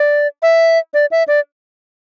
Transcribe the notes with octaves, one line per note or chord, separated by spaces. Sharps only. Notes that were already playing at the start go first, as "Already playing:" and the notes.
Already playing: D5
E5
D5
E5
D5